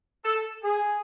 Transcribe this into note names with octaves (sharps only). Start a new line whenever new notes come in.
A4
G#4